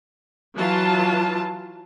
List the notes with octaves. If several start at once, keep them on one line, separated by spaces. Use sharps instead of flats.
E3 F#3 F4 A5